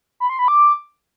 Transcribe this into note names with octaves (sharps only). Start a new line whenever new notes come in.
B5
C6
B5
D6